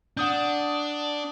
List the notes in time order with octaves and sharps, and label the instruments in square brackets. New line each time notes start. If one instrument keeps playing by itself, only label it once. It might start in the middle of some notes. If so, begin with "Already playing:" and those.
[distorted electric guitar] D4 [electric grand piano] F#5 D#6 G6